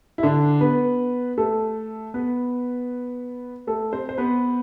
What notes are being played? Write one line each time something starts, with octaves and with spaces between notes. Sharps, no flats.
E4
D3 D4
B3 B4
A3 A4
B3 B4
A3 A4
C4 C5
C5
B3 B4